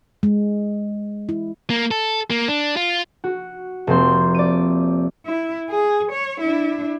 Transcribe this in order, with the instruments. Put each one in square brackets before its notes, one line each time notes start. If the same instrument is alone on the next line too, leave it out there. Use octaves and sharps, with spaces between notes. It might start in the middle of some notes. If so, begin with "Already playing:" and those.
[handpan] G#3
E4
[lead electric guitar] A#3
A4
A#3
D4
F4
[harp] F#4
F1 A#3 C4 C6
D5 D#7
[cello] E4
G#4
C#5
D4 E4